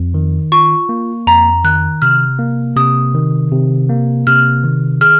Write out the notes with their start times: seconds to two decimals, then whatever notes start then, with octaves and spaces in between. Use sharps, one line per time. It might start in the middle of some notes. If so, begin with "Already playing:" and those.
Already playing: F2
0.14 D#3
0.52 F4 C#6
0.89 A#3
1.27 F2 A#5
1.64 D#3 F#6
2.02 C3 F6
2.39 A#3
2.76 C3 D#6
3.14 D#3
3.52 C3
3.89 A#3
4.27 C3 F6
4.64 D#3
5.01 G#4 F6